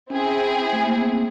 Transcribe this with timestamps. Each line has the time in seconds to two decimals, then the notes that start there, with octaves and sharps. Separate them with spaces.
0.10 C4 C#4 E4 G#4
0.73 A3
0.85 A#3
0.98 B3
1.11 C4